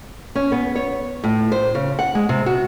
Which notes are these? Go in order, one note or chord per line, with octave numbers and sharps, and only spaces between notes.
C#4
B3
C#5
A2
C5
C#3
F#5
G#3
C3
F#4